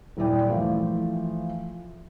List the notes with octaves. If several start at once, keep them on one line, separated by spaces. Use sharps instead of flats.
D#1 E4 D5 G5
E3 F3 A3